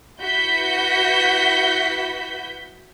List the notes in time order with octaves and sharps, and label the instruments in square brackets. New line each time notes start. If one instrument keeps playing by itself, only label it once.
[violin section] E4 F#4 B4 G6 B6